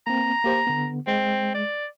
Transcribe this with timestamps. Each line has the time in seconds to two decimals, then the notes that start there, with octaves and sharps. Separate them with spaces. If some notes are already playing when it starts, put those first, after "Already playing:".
0.07 A#3 C4 A#5
0.44 A#3 G4 C5
0.67 D3 B3
1.07 G#3 C4
1.54 D5